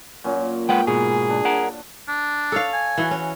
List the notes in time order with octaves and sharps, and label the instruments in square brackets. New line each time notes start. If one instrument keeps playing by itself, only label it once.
[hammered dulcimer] A#2 F#3 C#4
[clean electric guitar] G#3 B4 F#5 [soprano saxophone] G5
[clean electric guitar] G#2 B2 [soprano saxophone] G#4
[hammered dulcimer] D4
[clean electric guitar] A#4 F#5
[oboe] D4
[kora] A4 C#5 F5
[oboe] G#5
[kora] E3 F#4
C#4